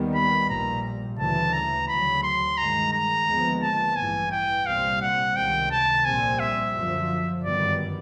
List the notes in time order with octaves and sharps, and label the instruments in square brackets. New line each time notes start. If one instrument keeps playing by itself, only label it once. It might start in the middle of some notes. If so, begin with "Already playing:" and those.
Already playing: [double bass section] D#2 D#3 G3 B3
[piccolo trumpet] B5
[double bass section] A#1 A#2 G3 [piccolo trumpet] A#5
[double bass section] D2 C#3 E3 [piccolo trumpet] A5
[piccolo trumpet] A#5
[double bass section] D2 C#3 F#3 [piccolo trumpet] B5
[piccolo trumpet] C6
[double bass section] G2 D#3 G#3 [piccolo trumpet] A#5
[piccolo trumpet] A#5
[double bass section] D#2 D3 F3 G#3 B3
[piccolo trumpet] A5
[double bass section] A1 G2 E3 [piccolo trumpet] G#5
[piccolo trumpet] G5
[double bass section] C2 A#2 G3 C4 [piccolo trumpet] F5
[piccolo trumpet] F#5
[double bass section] C#2 C3 D#3 [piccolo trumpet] G5
[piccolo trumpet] A5
[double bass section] A#1 A#2 G3 C4 [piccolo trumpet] G#5
[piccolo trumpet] E5
[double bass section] F#2 D3 F3
[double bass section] G1 F#2 D#3 G3 B3 [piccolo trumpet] D5